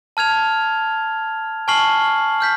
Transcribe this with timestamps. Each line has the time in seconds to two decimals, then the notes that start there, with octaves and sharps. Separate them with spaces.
0.17 A5 F6 G#6 F7
1.68 G#5 A5 C#6 F6 C7 F#7
2.40 F6 G6 B6